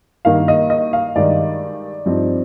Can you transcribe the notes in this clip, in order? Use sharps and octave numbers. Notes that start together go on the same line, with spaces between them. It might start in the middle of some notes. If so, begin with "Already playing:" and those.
G2 D#3 A#3 F5
D#5
D#5
F5
G2 D#3 G#3 D#4 D5
G2 F3 C4 D#4